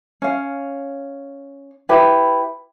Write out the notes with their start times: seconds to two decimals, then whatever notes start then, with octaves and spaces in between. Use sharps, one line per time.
0.22 C#4 F5
1.89 E4 G4 B4